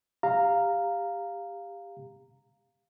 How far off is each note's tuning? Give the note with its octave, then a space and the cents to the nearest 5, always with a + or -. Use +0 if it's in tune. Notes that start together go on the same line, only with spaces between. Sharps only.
G4 +25 F5 +0 A#5 -10